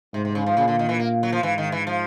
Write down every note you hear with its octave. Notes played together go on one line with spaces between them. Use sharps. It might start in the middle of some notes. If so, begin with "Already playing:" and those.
G#2 C3
C3
C#3
F3
A#2 C#3
D3
D#3
E3
A#3
F#3
F3
G#2 E3
D#3
E3
F3